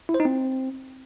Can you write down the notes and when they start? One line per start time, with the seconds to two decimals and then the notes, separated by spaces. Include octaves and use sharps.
0.09 E4
0.14 C5
0.20 D#4
0.25 C4